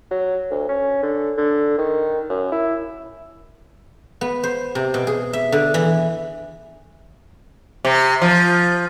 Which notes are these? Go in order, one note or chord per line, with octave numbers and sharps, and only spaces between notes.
F#3
D2
C#4
D3
D3
D#3
F#2
E4
B3
C5
C3
B2
G#4
E5
D3
E3
C3
F3